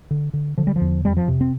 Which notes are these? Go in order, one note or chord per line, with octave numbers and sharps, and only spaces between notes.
D3
D3
D3 F3
G3
F3
E2
F2 G3
F3
C3
C4